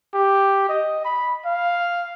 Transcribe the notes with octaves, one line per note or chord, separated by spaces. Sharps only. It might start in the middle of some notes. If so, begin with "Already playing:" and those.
G4
D#5
B5
F5